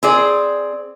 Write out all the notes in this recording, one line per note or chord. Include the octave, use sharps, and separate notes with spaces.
C4 G#4 D5